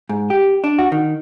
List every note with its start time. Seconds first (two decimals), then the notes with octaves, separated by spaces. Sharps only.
0.09 G#2
0.30 G4
0.64 D4
0.79 F#4
0.92 D#3